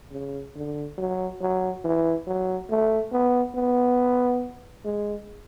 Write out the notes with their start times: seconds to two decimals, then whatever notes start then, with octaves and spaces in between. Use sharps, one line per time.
0.12 C#3
0.55 D3
0.98 F#3
1.41 F#3
1.84 E3
2.27 F#3
2.70 A3
3.12 B3
3.55 B3
4.85 G#3